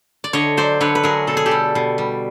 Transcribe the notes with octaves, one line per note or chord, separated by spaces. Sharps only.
D5
D3 C#5 D#5
F#3 C5 D5
D3 B4 C#5
B4
F#3 G#4 A#4
B2 A4
G#4
G4 A4
G3
B2
G3